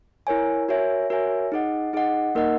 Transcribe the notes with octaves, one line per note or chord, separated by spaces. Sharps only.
E4 A#4 C#5 G#5
F#4 A#4 C#5 E5 G#5
F#4 A#4 C#5 E5 G#5
D#4 G#4 D#5 F#5
D#4 G#4 D#5 F#5
A#3 D#4 A#4 D#5 F#5